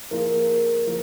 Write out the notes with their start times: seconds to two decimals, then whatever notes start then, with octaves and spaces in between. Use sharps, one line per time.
0.11 F3 A#3 F4 G#4 A#4
0.86 F3 A#3